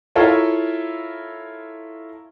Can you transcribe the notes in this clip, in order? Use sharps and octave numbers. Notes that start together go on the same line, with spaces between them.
E4 F4 A4 A#4 C#5